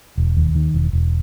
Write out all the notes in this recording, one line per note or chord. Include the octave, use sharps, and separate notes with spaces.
E1
D#2
D#3
E1
E1